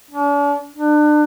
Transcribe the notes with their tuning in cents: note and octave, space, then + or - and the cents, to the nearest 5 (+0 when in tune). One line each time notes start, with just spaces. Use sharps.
D4 -45
D4 +30